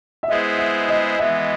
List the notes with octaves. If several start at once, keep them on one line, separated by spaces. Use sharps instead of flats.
E5
G#3 B3 E4 G#4 C5 D#5
E5
D#5
E3 G#3 B3 E5